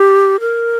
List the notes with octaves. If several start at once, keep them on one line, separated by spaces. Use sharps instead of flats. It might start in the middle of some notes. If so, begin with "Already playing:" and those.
Already playing: G4
A#4